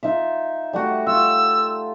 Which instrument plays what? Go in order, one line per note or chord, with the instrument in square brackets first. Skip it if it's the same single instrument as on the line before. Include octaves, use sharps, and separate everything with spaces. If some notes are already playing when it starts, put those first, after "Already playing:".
[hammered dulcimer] D#4 F4 E5
G3 A3 F#4
[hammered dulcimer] F4 [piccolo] E6